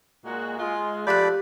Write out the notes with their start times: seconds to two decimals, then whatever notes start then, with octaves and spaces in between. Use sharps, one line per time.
0.25 A#2 G#3 F#4
0.58 G#3 F4
1.07 F3 A3 G4 D5 B5 F#6